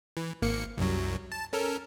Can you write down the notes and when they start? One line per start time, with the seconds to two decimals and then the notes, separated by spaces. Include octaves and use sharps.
0.17 E3
0.42 G#1 A#3 C#7
0.78 C2 F#2 F#3
1.32 A5
1.53 C#4 A4 A#4